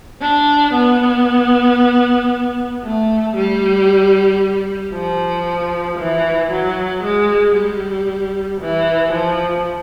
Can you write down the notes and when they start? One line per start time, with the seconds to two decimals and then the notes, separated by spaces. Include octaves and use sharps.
0.22 D4
0.74 B3
2.84 A3
3.36 G3
4.94 F3
5.98 E3
6.51 F#3
7.03 G#3
7.56 G3
8.61 E3
9.13 F3